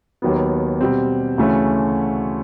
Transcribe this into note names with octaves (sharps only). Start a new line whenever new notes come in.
D#2 D#3 F#3 B3
B2 G3 C4
D2 C#3 E3 A3 C#4